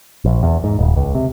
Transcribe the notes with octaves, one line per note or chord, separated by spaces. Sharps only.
A#1
E2
G#2
D#1
C#2
C3